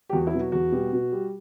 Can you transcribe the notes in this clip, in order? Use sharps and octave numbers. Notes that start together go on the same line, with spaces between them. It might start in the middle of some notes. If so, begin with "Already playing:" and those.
G4
E2 F#4
E4
B2 F#3
F#4
E2 F#4
B2 G3
B2
G3